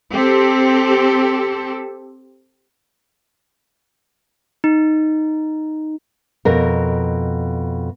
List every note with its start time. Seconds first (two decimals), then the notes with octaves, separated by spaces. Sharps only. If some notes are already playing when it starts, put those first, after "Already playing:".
0.11 C4 G4 A4
4.64 D#4
6.45 F2 B2 A#4